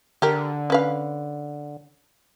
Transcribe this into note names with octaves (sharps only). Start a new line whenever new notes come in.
D3 G4 A#4
C#4 B4 F5